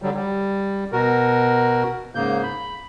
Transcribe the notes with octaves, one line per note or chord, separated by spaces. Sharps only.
D3 F#3 G3
G3
B2 F#4 A#4
G#2 C#3 A#3 G6
B5